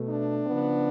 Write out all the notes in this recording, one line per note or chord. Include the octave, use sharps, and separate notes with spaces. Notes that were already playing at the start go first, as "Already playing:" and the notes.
Already playing: B2 A3
D4
C#3 F3 B3